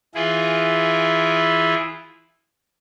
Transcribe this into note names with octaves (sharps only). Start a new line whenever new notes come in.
E3 E4 F4 G#4